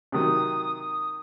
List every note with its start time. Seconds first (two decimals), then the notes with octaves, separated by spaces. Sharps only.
0.12 C3 D#3 F#3 D#6
0.78 D#6